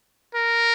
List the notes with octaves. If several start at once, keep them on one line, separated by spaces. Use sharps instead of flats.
A#4